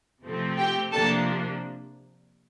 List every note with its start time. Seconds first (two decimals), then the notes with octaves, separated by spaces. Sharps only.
0.24 C3 F3 A3 C4
0.58 G4 G5
0.92 C3 F3 A#3 D4 A4 A5